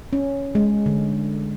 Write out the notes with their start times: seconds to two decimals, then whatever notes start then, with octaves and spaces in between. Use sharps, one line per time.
0.13 C#4
0.55 G#3
0.86 D3